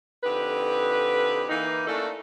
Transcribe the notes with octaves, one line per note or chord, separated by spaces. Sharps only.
F2 D3 D#4 G4 B4
E3 A#3 D#4
A3 A#3 C#4 D4 E4 A4